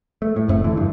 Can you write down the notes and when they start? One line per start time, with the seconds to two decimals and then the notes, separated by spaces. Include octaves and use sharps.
0.22 A3
0.36 A2
0.48 F#1 F2 A3
0.64 D3 E3
0.77 G2